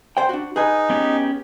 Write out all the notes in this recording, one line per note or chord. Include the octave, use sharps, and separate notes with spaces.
C5 G5
D4 F#4
D#4 G#4 B4 G#5
B3 C#4 G4